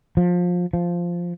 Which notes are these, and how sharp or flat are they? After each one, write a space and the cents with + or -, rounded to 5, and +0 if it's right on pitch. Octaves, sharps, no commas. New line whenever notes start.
F3 +25
F3 -5